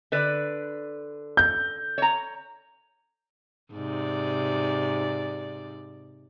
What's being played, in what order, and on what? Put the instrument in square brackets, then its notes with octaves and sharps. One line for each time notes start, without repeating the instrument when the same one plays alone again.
[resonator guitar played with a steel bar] D3 B4 D5
[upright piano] G6
[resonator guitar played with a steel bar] C#5 A#5
[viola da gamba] G#2 C3 D5